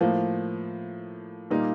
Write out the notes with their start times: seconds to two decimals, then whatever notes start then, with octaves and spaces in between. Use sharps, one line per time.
0.01 A2 F3 A#3
1.50 A#2 G3 A#3 D#4